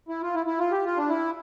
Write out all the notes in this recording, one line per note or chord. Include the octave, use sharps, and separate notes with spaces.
E4
F4
E4
E4
F4
G4
F4
D4
E4